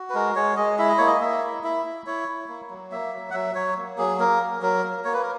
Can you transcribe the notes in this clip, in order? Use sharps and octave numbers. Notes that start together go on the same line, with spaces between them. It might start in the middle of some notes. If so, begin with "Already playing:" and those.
Already playing: F#4
B4
G#3 A#4
G#3 C#5
G#3 D#5
E4 E5
D#5
A#3 C#5
D#5
A#3 E5
E4
E4 E5
E4
E4 C#5
E4
A#3
F#3
A#3 E5
F#3
F#5
F#3 E5
F#3 C#5
A#3
F#3 G#4
A#3 A#4
F#3
F#3 A#4
A#3
A#3 C#5
B4
A#4